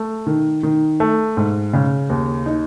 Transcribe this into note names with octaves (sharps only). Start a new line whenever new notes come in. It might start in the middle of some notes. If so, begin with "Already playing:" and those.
Already playing: A3
D#3
D#3
A3
G#2
C#3
D#2
D#4